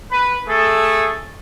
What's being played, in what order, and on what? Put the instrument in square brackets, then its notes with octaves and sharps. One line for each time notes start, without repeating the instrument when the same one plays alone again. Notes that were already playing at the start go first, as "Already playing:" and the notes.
[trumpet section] B4
A3 G#4 A4